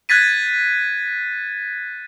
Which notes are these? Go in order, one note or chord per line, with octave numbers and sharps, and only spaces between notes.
F#6 G#6 A6 B6 D#7